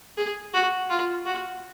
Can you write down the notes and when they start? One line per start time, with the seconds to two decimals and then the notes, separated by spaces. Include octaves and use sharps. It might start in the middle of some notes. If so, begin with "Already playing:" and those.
0.17 G#4
0.54 F#4
0.90 F4
1.26 F#4